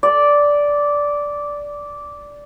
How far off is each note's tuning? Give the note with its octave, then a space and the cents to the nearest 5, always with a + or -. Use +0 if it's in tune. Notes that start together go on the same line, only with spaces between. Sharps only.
D5 -10